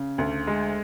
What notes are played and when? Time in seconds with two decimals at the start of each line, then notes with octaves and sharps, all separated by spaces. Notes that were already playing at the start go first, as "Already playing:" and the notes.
Already playing: C#3
0.18 D2
0.47 G#3